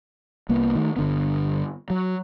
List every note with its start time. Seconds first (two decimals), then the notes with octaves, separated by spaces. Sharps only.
0.49 C2 A#3 B3
0.75 D#3 A3
0.96 G1 D3 B3
1.90 F#3